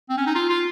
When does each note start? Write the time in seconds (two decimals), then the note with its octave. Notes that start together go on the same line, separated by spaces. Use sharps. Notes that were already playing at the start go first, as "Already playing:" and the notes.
0.09 C4
0.17 C#4
0.26 D#4
0.35 F4
0.50 F4